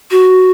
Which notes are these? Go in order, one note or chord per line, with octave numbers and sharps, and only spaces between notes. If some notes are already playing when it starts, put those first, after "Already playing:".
F#4